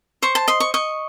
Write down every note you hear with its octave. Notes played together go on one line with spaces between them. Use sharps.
C5 C#6
A5
D#5 C6
C#6
D#5 C#6